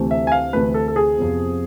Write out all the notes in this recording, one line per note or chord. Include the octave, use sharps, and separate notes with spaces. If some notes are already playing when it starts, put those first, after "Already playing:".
Already playing: D2 C3 E3 A3
E5
G#5
F5
D2 C3 E3 A3 B4
A4
A4
G#4
F2 C3 F3 B3